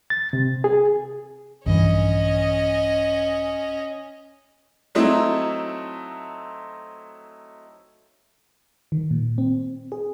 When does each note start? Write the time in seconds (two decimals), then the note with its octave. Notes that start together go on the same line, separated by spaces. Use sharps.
0.10 A6
0.33 C3
0.64 G#4
1.66 A#1 G2 E3 C#4 D#5
4.95 F#3 A3 C4 D#4 E4
8.92 D#3
9.11 A#2
9.38 C4
9.92 G#4